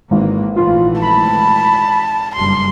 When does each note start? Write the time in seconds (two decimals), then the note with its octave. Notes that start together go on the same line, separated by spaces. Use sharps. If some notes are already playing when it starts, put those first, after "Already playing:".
0.11 G#1 G#2 E3 A#3
0.56 A#1 E3 A3 F4
1.02 A5 B5
2.36 F#1 G2 G3 C6